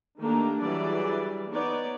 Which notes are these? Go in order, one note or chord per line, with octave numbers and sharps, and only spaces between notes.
D#3 A3 A#3 D4 G4 A#5
E3 F#3 G3 G#4 D5
B3 D#4 C#5 D5